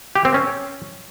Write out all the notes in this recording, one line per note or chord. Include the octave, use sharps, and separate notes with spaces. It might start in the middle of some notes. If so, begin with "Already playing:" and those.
G4
C4
C#4